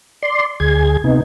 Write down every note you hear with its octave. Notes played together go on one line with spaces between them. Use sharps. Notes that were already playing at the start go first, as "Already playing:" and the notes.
D5 C6
D2 G#4 G#6
C3 B3 D#4